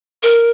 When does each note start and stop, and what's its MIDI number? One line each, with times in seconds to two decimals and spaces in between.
0.23 0.51 70